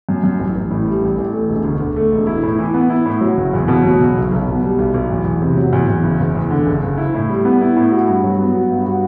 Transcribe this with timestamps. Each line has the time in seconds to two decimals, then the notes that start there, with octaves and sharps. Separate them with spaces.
0.09 F#2
0.24 F#2
0.39 A1
0.55 A1
0.70 A2
0.86 G3
1.02 A1
1.17 A1
1.33 A3
1.50 E1
1.64 D2
1.81 D3
1.96 A3
2.12 E1
2.27 E4
2.43 A2
2.59 E3
2.74 B3
2.90 E4
3.05 A2
3.21 F#3
3.37 F#1
3.53 E2
3.68 B2
3.84 F#3
4.01 F#1
4.16 B1
4.31 B1
4.47 B2
4.63 G3
4.78 B1
4.94 B1
5.10 E2
5.25 E2
5.42 C3
5.57 F#3
5.73 E2
5.88 E2
6.04 F#1
6.20 F#1
6.35 E2
6.50 D3
6.66 F#1
6.82 F#1
6.98 E4
7.14 A2
7.29 G3
7.45 B3
7.61 E4
7.76 A2
7.91 F#4
8.07 G2
8.24 F#3
8.39 B3
8.54 F#4
8.70 G2
8.86 F#4